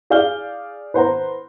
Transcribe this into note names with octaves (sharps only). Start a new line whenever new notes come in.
G#4 D5 F5 F6 G6 G7
B4 C5 F#5 A#5